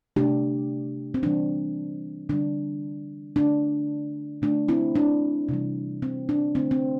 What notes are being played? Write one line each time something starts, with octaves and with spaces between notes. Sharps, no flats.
C3 A3 D4 G4
C4
C3 E3 G3 D4
D3 G3 D4
D3 A3 D4
D3 A3 D4
C4 E4
D4
C3 E3 G3
C4
D4
D3 A3 C4
C4